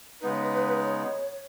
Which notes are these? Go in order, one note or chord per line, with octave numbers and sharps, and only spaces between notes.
C#3 G#3 B3 D#4 B4
C#5